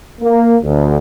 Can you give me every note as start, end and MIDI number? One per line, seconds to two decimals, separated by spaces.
0.21 0.55 58
0.63 0.97 38